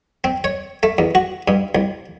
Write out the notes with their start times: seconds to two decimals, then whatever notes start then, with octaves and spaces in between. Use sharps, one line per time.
0.24 C4
0.44 C#5
0.83 A3
0.98 E2
1.15 F#4
1.48 G2
1.75 C2